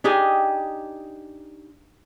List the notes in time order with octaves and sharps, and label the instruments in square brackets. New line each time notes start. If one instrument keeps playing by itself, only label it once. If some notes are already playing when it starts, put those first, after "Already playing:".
[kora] D4 D#4 G4 G#4